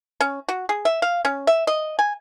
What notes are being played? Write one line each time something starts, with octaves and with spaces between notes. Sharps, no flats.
C#4
F#4
G#4
E5
F5
C#4
E5
D#5
G#5